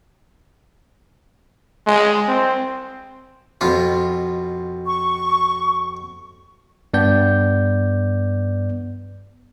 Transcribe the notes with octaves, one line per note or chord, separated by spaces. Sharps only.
G#3
C4
F2 B2 F4
C#6
G2 B3 D5 G6